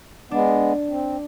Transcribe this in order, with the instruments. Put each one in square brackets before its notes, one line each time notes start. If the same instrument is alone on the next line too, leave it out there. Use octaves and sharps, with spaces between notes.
[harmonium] G#3 B3 [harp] D4
[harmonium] C4